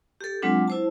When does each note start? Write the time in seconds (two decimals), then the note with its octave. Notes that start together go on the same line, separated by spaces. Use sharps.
0.21 G4 A4
0.42 F#3 G#3 C4 D4 F4
0.68 E4 C5 A5